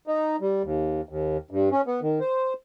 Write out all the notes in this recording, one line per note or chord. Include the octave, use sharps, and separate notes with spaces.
D#4
G3
D#2
D#2
G2
C#4
B3
D#3
C5